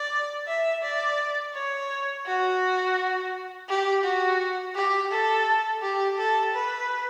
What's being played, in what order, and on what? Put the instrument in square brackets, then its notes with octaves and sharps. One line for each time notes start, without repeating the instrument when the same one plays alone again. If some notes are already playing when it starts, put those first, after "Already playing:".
Already playing: [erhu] D5
E5
D5
C#5
F#4
G4
F#4
G4
A4
G4
A4
B4